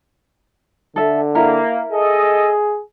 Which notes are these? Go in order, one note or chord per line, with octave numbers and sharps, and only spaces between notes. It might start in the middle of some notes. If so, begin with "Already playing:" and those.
D3 A4 E5
A#3 E4 A#4
G#4 A4 D#5